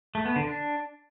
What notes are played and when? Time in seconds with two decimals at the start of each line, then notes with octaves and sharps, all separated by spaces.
0.15 A3
0.25 B3
0.36 D3
0.46 D4